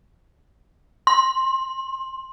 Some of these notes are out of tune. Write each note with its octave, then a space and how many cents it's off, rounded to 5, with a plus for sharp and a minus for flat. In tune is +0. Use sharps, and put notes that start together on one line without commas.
C6 +15